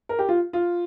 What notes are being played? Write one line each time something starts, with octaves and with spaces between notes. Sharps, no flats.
A#4
G4
F4
F4